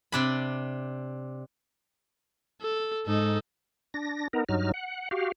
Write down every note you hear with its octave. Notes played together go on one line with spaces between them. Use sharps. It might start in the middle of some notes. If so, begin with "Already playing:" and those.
C3 D4 B5
A4
G#2 D#4 A4
D4 A#6
B3 D#4 A#4
G2 F#3 D#4 F6
F#5
F#4 G4 F5